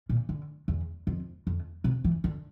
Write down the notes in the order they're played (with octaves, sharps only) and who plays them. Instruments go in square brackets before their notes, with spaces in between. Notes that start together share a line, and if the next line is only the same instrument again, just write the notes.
[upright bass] A#2
D3
E2
F2
F2
C3
E3
D3